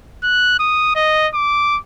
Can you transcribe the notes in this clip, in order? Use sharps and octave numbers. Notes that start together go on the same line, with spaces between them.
F#6
D#6
D#5
D6